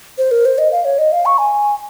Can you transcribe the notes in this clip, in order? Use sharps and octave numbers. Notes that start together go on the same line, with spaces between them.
C5
A#4
C5
D#5
F5
C#5
D#5
F5
C#6
G#5